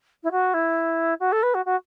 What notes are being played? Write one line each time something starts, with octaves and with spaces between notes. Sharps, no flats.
E4
F#4
E4
F#4
A4
B4
F#4
F#4